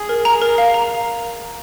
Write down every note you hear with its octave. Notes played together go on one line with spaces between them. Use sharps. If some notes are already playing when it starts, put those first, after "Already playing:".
Already playing: G#4
A#4
A#5
A#4
F5
A#5